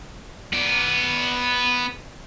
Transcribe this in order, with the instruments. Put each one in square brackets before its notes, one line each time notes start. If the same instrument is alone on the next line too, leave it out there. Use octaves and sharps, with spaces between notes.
[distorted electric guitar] B3 D5